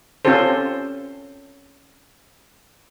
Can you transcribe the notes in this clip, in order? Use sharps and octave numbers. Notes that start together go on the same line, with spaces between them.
C4 C#4 F4 G4 A4 C5